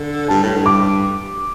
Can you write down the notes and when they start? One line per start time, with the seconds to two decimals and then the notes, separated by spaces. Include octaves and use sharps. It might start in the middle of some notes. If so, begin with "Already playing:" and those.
Already playing: D3
0.28 G2 A5
0.42 A2
0.56 G2
0.66 D6